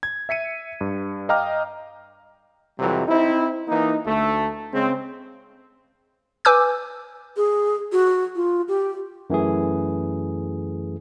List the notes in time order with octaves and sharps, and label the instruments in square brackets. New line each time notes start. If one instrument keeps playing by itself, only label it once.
[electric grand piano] G#6
E5 B6 C#7 D#7
G2
D#5 F5 G5 A#5 D6 F6
[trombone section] F2 C3 E3 F#3 G3
C4 D#4 E4
E3 A#3 D#4
D2 A3
C#3 G#3 C4
[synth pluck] B4 G#5 D6 E6 G6
[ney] G#4
F#4
F4
G4
[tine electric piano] F#2 E3 A3 G#4